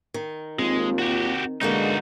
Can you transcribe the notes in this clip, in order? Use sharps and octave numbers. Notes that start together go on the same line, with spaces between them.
D#3
D#2 G#3 A#3 C4 F4
F#4 G4
B2 D3 D#3 G#3 A#3 D#4 F#4